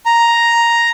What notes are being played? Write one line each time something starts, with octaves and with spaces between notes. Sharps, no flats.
A#5